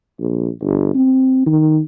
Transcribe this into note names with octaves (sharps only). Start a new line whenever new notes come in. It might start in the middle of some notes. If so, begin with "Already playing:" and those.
A#1
G1
C4
D#3